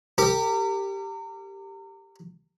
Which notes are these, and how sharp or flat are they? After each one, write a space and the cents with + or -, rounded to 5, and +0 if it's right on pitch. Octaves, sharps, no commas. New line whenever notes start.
G4 +0 A#4 -35